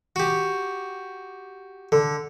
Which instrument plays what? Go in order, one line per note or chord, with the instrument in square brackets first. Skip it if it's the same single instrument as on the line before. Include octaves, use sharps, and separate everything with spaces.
[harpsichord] F#4 G4
[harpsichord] D3 [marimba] A4